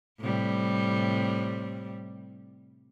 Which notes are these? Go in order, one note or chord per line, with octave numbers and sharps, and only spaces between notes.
A2 C3 G3